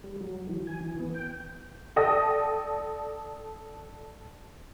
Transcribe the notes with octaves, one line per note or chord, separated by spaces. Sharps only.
G3
F#3
E3
G#5
E3
B3
G5
A4 D5 G5 D#6 A#6